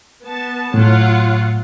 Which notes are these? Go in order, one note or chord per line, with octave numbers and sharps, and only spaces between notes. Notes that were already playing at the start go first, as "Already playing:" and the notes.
B3 A5
A2 F#3 F4 F#5